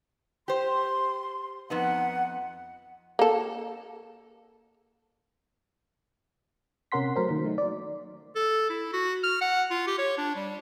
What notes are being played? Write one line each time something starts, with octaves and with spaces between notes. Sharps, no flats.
G4 C5 C6
F2 B3 D#4 F#5
A#3 A4
C3 C#4 A#4 F#5 C6 B6
F#3 A3 A#4 C5
D#3 A#3
F#3 A3 D#4
D5
A4
E4
F#4
F6
F#5
F4
G4
C#5
D4
G3